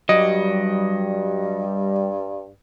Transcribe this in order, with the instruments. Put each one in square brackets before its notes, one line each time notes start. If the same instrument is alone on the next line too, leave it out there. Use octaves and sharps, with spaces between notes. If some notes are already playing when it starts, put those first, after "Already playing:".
[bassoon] G2 [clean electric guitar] F#3 [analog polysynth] G3 [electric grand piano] D#5